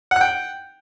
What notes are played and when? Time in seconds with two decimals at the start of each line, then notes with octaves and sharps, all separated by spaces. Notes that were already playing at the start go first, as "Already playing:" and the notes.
0.11 F#5
0.16 F#6
0.21 G5